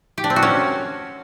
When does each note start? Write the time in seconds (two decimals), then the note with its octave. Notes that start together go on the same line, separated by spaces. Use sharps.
0.18 G4
0.24 D4
0.30 C4
0.36 F#4
0.43 C#4